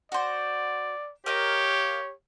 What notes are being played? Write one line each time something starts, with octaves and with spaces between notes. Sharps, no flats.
F#4 C5 D5
G4 A#4 C#5 D#5 F5